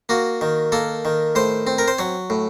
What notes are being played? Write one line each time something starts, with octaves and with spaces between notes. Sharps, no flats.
A#3 F#4
D#3
A#3 A4
D#3
A2 C5
C4
A#4
C5
F#3 C#5
A2